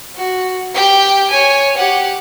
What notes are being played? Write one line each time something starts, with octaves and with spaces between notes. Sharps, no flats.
F#4
G4 G5
C#5 G#5
G4 F#5